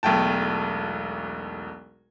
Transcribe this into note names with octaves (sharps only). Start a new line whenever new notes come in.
E1 B1 A3 G5 A5